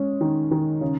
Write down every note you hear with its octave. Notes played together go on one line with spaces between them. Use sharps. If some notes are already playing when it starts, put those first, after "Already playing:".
Already playing: G#3 C#4
D#3
D#3
C#3